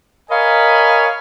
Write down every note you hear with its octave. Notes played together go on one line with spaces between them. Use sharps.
A#4 C#5 D#5 F5 G#5 B5